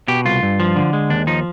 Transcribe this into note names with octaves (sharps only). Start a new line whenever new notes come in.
B2 G4
C2 F4
G2
F3
D3
G#3
D#2 D4
F3 D#4